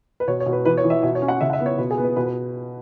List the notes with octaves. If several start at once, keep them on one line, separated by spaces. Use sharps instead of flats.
B4
B2 C#5
C#5
B2
B4
E3 B4
C#5
E3
E5
B2 E5
C#5
C#4
F#5
C#3 E5
F#5
E5
B3
C#5
B2 B4
G#4
B3
B4
B2 B4
B4